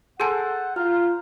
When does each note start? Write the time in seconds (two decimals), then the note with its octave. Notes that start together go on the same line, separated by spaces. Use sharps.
0.20 G#4 A4 C5 F#5 G#5 A5
0.76 F4 A#5 F6